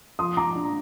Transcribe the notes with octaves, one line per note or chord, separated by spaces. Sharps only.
F3 C6 D#6
F3 A#5 D6
D4